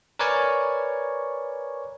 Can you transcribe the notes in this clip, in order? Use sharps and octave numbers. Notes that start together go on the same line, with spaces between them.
A#4 B4 C#5 D5 G#5 C#6